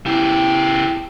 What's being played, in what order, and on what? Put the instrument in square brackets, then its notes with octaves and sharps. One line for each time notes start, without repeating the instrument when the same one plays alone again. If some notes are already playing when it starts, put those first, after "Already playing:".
[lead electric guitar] C#3 G4 [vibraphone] E4